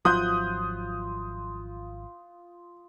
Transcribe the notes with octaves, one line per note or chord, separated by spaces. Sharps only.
G#1 F3 F#3 F4 D#6 F#6 G6